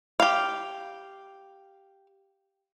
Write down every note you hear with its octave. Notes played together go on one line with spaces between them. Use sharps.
G4 F5